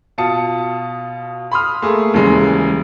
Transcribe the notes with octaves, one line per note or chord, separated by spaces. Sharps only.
B2 F4 A5 D#6 C#7
B5 C6 D#6 F6
A3 A#3 G#4
D#1 C#3 E3 G#3